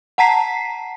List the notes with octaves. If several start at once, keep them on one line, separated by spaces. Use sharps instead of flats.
F#5 A5 A#5 B6 C7